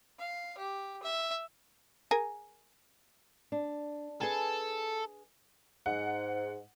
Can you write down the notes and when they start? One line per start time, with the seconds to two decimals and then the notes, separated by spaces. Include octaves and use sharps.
0.19 F5
0.58 G4
1.03 E5
2.11 G#4 A#4 G#5
3.52 D4
4.21 G#4 A4 B4 G#5
5.86 G#2 F#5